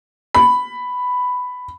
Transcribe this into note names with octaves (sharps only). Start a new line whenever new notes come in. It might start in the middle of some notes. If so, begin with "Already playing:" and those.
B5